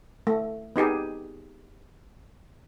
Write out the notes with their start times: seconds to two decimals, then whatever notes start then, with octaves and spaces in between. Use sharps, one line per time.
0.27 A3
0.76 B3 D#4 G4 G#4